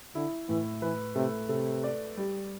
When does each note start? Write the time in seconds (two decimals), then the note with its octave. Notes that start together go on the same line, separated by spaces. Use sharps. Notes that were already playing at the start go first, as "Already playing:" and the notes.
0.15 D3 E4
0.49 A2 E3
0.82 E3 B4
1.15 C3 A3
1.49 C3 A4
1.84 D5
2.17 G3